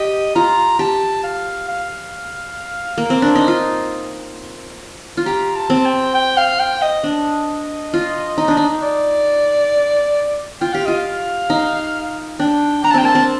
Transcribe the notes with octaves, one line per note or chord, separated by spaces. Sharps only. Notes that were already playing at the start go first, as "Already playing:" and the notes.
Already playing: G4 D#5
F4 A#5
G4 A5
F5
F5
A#3
C4
D4
D#4
F4
F4
G4 A#5
A5
C4
G5
G5
F5
G5
D#5
D4
F4
D#4
D4
D#4
D5
F4 G5
G4 F5
F4 D#5
F5
D#4
D4 G5
D4 A#5
A5
C4 G5
A#3 A5
C4